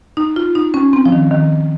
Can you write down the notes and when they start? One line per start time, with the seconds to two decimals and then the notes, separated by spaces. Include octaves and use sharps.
0.17 D#4
0.36 F4
0.55 D#4
0.74 C#4
0.93 C4
1.05 F3
1.12 D#3
1.31 D#3